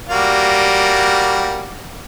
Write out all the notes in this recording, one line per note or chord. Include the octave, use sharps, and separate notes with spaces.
G3 A#3 F#4